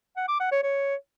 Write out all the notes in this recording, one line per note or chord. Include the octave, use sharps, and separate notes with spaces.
F#5
D6
F#5
C#5
C#5